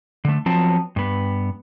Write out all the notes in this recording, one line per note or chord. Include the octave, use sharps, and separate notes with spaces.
D3 A3
F3 F#3 B3 C4 A5
G2 B3